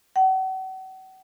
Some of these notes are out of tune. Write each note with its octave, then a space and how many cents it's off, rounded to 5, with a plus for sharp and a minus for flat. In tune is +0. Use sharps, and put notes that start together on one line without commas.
F#5 +40